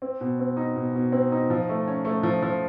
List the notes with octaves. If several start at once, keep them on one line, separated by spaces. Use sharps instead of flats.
C4
B2
C4
D#4
B2
B2
C4
D#4
F3
A3
C#4
A3
F3
F3